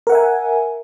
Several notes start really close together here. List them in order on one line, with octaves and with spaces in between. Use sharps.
A#4 F#5 E5 G#5